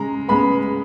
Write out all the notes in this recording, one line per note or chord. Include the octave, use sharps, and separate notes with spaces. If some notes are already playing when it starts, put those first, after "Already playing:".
Already playing: C#3 G#3 A#5
C#3 G#3 B3 B5